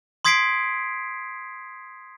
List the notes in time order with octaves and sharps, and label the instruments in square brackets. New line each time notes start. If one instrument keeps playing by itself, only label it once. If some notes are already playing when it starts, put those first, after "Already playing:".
[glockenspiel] C6 D#6 G#6 B6 C7 D7